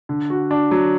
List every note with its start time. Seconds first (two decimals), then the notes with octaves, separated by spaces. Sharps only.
0.09 D3
0.30 F#4
0.51 D4
0.71 F#3